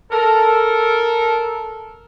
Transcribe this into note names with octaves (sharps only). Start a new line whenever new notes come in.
A4 A#4